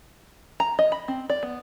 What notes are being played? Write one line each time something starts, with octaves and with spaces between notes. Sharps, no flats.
A#5
D#5
B5
C4
D5
B3